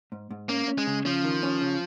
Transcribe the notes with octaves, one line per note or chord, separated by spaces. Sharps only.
G#2
G#2
A#3 C#4
C#4
G#3
C#3
F3 C#4
D#3
C#4
C#3